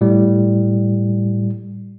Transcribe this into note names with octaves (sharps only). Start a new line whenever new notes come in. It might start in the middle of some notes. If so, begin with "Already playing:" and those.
A2 G3